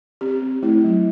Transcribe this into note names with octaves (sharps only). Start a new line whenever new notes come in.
C4 G4
C4
A3 E4
F#3